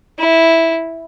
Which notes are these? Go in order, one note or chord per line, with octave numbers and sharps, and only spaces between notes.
E4